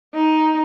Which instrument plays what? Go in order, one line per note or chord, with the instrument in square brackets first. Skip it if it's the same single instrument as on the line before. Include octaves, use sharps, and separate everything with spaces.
[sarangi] D#4